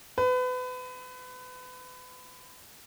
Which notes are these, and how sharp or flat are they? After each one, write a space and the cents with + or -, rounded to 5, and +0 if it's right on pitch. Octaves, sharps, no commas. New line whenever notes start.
B4 +30